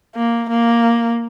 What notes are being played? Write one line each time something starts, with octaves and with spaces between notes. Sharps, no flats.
A#3
A#3